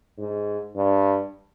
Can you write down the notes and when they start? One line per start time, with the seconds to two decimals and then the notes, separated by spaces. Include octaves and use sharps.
0.18 G#2
0.76 G2